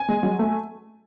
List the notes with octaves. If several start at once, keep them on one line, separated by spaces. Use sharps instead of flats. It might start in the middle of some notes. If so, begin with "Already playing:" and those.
Already playing: G#5
G#3
F#3
A3